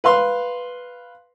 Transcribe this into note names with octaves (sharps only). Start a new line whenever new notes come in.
B4 F5 C6